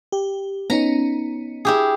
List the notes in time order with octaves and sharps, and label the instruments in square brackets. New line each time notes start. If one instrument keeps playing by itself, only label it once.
[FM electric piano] G4
[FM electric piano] B3 C#4 D#4 [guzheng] A#5
[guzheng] E4 G4 G#4